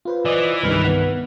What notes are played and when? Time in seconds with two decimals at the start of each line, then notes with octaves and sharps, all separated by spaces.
0.05 F4 B4 C5
0.25 E3 D5 D#5
0.63 C2 G2 D#3 B4 B5 F6
0.84 B3 F#5